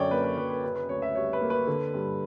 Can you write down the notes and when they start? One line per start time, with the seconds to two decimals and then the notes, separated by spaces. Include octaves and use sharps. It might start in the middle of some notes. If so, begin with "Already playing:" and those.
Already playing: F#2 D3 C#5 D5 G5
0.11 A#3 B4
0.24 B4
0.37 F#2 B4
0.50 B4
0.63 C#3 B4
0.76 B4
0.89 D2 C#5
1.02 E5
1.15 G3 C#5
1.33 B4
1.41 A#3
1.50 B4
1.67 D3
1.94 G2